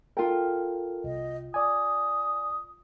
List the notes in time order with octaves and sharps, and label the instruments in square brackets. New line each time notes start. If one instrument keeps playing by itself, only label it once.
[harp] F4 G5 [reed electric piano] A4 A#4
[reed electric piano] C2 [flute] D#5
[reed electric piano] D5 G#5 [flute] D#6